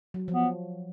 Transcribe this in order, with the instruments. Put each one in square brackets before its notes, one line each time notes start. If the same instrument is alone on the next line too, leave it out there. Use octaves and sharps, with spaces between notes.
[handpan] F#3
F3
[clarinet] B3